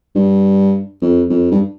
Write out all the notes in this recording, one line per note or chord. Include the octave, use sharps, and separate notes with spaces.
G2
F2
F2
G2